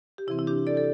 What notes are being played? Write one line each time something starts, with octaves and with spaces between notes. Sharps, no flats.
G4
C3 E3 C4 E4
E4
D4 G4
A4 D5
A4